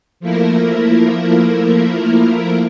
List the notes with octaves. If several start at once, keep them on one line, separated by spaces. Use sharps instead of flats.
F3 A3 A#3 E4 A#4